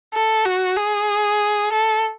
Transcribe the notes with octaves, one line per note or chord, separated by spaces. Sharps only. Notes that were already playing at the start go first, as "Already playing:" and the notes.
A4
F#4
G#4
A4